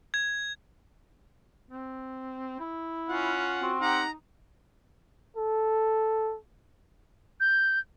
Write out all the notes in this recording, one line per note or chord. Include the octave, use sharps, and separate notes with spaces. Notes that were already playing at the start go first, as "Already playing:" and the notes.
G#6
C4
E4
C#4 F4 F#5
C4 F#4
D#4 G4 F#5 A#5
A4
G6